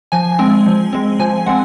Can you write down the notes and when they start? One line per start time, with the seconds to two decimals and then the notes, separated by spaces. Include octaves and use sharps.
0.12 F3 G#5
0.39 G#3 C4
0.66 F3
0.93 G#3 C4
1.19 F3 G#5
1.46 G#3 C4 F#5